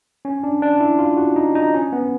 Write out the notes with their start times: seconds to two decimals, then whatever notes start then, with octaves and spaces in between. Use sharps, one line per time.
0.25 C#4
0.43 D4
0.62 D4
0.80 E4
0.99 F4
1.17 F#4
1.36 D#4
1.55 D#4
1.74 C#4
1.93 B3